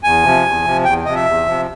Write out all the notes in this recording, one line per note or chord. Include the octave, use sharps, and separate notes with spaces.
E2 G#5
C3 F3
E2
C3 F3
E2 G5
C3 F3 D#5
E5
E2
C3 F3